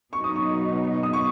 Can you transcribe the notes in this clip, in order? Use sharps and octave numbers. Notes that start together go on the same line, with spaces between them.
B2 F#3 B3 D#4 C#6
D#6
C#6
D#6
C#6